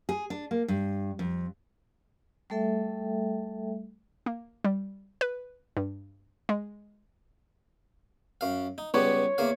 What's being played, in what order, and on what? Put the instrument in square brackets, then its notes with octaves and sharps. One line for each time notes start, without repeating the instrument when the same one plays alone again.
[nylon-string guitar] G#4
D4
A#3
G2
F2
[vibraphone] G3 A3 A4 E5 G5
[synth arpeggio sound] A#3
G3
B4
G2
G#3
[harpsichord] F#2 F5
D#4
[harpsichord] C#2 G3 B3 [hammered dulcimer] C#5
[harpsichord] E2 A#3 F5